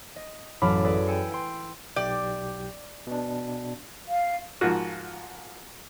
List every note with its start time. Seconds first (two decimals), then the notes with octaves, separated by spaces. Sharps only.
0.16 D#5
0.61 A1 F#2 A3 B5 D6 F6
0.84 G#4 A4 B4 D5
1.07 G5 G#5 E6 C#7
1.32 G5 C6
1.96 B1 G4 D5 G6
3.07 B2 D4
4.08 F5
4.61 G#2 F3 A#3 F4 F#4